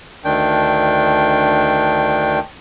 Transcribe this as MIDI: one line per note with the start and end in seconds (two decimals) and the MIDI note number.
0.24 2.39 38
0.24 2.39 51
0.24 2.39 62
0.24 2.39 79